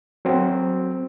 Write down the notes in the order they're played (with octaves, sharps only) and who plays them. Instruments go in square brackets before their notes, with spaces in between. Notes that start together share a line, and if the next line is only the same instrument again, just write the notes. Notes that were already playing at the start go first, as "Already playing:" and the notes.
[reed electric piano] F#3 C4